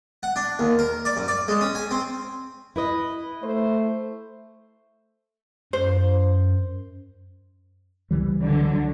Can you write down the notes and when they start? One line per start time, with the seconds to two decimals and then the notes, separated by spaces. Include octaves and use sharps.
0.23 F#5
0.36 D4
0.59 D#2
0.79 A#4
1.05 D5
1.17 F#2
1.28 D5
1.48 G#3
1.61 C#4
1.75 G#5
1.91 C4
2.76 E4 B4 D#5
3.43 A3 C5
5.73 F#2 C5
8.11 C#2 E3 G3
8.44 D3 F#3